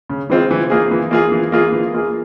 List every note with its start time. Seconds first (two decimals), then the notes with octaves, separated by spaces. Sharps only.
0.09 C#3
0.29 E3 G#3 C4 F4
0.51 E3
0.70 A#3 F4 G#4
0.91 E3
1.11 A#3 F4 G#4
1.32 E3
1.52 A#3 F4 G#4
1.72 E3
1.94 A#3 F4 G#4